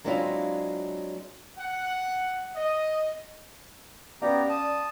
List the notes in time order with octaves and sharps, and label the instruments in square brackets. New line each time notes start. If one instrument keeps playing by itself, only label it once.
[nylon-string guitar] F#3 G#3 C4 D4 E4 F4
[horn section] F#5
D#5
[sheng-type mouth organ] B3 G4 A#5 [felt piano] C#4 D5 F5
[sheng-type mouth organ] A5 D#6